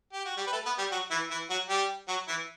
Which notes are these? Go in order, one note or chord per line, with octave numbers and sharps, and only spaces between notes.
G4
F#4
G3 G4
B4
A3 A4
B3 B4
G3 G4
F#3 F#4
E3 E4
E3 E4
F#3 F#4
G3 G4
F#3 F#4
E3 E4